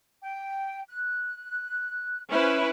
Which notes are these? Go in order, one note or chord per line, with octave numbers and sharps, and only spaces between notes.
G5
F#6
C#4 E4 B4 C5 F6